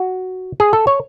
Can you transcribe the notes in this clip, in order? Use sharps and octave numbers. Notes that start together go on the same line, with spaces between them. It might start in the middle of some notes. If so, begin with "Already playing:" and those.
Already playing: F#4
G#4
A4
C#5